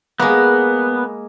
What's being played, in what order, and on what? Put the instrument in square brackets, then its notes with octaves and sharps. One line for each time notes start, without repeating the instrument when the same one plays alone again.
[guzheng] G#3 A#3 [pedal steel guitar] B3